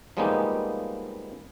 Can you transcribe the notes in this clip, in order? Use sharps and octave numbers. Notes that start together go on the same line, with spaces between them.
F3 G3 G#3 A#3 B3 D#4